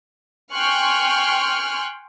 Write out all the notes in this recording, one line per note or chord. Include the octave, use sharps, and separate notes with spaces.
G5 G#5 C6 C#6 F6 F#6